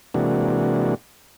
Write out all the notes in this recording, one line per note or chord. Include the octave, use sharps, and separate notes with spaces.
C3 E3 G#3 A#3 D4 F#4